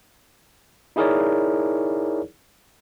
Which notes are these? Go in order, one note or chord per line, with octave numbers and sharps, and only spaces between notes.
D#4 E4 G#4 A#4 C#5 D5